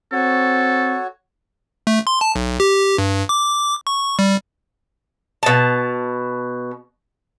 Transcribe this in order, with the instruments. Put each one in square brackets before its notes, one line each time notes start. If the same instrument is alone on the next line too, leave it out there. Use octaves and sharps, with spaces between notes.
[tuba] C4 [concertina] F#4 C#5 [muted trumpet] A4
[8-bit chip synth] A3
C6
A5
B1
G4
G2
D6
C#6
G3
[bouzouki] B2 A5